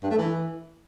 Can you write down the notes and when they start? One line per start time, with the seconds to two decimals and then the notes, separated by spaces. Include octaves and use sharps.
0.03 G2
0.11 A3
0.18 E3